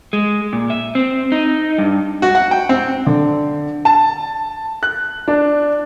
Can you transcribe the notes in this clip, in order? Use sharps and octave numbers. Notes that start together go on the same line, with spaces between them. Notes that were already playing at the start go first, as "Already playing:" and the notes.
G#3
A#2
E5
C4
D#4
G2
F#4
F#5
G5
C4
D3
A5
F#6
D4